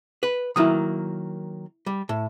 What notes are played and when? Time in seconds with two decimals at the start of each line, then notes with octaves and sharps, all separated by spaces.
0.23 B4
0.56 D#3 F#3 A#3 E4 D#6
1.86 G3
2.09 A2